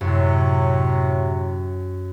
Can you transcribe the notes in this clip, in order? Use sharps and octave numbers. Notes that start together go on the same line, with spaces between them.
F#2 A2 C3 F#3